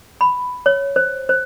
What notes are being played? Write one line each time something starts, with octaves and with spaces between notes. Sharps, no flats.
B5
C#5
C5
C5